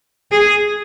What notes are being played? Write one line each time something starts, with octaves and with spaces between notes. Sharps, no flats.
G#4